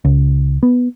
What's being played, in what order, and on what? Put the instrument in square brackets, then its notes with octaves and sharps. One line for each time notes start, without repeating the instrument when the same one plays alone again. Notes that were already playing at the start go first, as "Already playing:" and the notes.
[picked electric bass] C#2
B3